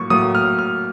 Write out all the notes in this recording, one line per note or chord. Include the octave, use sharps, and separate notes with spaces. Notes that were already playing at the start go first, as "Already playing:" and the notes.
Already playing: A2 F#3 A#3 C#6
A2 F#3 A#3 D#6
F6
F6